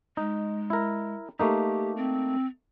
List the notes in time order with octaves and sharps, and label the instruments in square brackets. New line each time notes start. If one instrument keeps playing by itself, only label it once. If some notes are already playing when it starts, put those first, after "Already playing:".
[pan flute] G#3 [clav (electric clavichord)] D#4
[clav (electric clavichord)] E4 A#4
[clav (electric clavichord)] A3 A#3 D#4 [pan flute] G4
[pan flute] C4